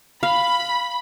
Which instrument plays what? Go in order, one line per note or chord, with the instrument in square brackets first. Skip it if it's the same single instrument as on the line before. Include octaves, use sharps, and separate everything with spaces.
[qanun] F5 [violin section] B5